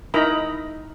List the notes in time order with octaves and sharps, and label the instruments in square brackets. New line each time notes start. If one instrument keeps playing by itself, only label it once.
[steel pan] D#4 E4 A#4 D#5 A#5 B5